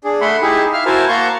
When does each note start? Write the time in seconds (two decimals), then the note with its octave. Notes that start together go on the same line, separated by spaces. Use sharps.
0.04 D4 G#4
0.21 A3 E5 F#5 B5 C6
0.42 D#4 E4 G4 G#4 E5
0.73 E5 F5 F6
0.86 E4 F#4 A#4 C5 G#5 A5
1.08 A#3 F#5 A5 A#5 C6 C#6